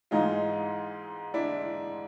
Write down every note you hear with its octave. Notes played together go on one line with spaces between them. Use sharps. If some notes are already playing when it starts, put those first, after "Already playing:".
G#2 E3 G#3 D#4 F4
D4 E4